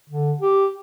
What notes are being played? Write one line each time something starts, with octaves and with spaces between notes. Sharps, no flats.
D3
G4